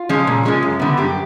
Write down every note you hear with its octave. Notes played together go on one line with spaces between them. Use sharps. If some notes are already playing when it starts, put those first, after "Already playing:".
Already playing: F4
F3 G#3 C#4
A#2
F3 G#3 C#4
F#2
D3 G3 B3
F#2 G4